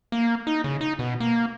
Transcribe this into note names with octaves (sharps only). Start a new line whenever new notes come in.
A#3
D#4
C#3
D#4
B2
A#3